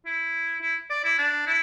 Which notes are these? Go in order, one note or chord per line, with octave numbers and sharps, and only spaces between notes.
E4
E4
D5
E4
D4
E4